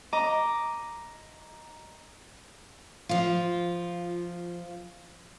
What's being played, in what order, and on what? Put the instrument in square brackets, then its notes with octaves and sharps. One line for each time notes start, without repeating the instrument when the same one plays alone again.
[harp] D#5 A#5 D6
[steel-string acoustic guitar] F3 F4